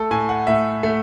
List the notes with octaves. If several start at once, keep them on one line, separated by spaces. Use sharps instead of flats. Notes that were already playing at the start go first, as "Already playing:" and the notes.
Already playing: A3 A4
A2 G#5
F#5
A2 E5
A3